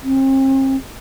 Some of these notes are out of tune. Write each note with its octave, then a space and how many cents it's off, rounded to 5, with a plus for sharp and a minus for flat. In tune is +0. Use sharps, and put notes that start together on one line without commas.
C4 +40